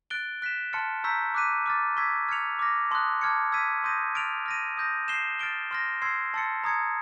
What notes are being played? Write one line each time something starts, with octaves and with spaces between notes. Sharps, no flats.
F#6 A6 D7 G7
F#6 B6 E7
A5 C6 F6 A6 C#7
A#5 C#6 E6 G6 B6
D6 F#6 B6 D#7
D6 F6 A6
C#6 E6 G#6 B6
F6 G#6 C#7 F7
D6 F6 A#6
A5 C6 D#6 F#6
A5 D6 F6 G#6 C#7
E6 G#6 B6 D#7
C6 D#6 G6 A#6 D#7
F6 A6 D7 F7
F6 A#6 D#7
D#6 G6 A#6
G6 C7 E7 G7
F6 A6 D7 G7
C6 F6 A#6
C6 E6 G#6 C7
A5 C6 E6 A6 C#7
A#5 D#6 G#6 C#7